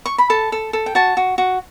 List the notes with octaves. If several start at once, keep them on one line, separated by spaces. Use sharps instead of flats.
C#6
B5
A4 A5
A4
A4
G5
F#4 A5
F#4
F#4